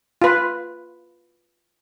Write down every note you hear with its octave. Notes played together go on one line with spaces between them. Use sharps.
F4 B4